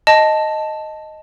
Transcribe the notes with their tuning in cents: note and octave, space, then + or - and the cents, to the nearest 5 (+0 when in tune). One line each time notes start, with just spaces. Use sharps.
D#5 +0 A5 +0